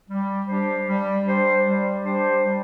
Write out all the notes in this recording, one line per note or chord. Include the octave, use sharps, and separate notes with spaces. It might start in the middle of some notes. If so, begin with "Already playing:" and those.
G3
D4 G4 C5
G3
D4 G4 C5
G3
D4 G4 C5
G3